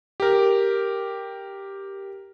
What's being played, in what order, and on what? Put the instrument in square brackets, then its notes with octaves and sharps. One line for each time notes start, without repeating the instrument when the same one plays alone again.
[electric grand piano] G4 A#4